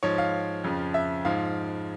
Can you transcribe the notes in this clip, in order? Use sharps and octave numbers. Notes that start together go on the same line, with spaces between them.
G#2 F3 C#5
F5
F2 C#3 F3
E5
G#2 F3 F5